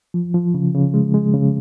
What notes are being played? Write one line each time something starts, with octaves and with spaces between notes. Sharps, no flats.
F3
F3
C#3
C#3
G#3
G#3
C#3